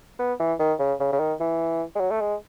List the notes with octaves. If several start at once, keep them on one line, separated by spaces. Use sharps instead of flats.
B3
E3
D#3
C#3
C#3
C#3
D#3
E3
G#3
F#3
A3
G#3